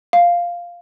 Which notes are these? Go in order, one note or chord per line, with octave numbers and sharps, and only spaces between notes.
F5